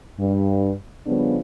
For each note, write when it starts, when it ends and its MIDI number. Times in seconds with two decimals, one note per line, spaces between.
0.18 0.71 43
1.06 1.37 49
1.06 1.37 53
1.06 1.37 55
1.06 1.37 59
1.06 1.37 61
1.06 1.37 62